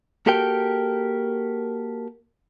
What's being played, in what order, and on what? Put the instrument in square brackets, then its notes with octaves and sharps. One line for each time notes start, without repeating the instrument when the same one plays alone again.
[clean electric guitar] A#3 F#4 G4 A4 A#4 G5